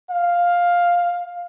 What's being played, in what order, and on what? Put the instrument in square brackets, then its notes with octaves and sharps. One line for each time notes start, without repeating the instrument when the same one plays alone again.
[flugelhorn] F5